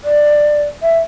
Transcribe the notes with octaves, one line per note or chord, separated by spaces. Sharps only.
D5
E5